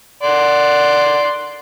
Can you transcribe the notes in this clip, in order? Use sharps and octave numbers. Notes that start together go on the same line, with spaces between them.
D5 F#5 C6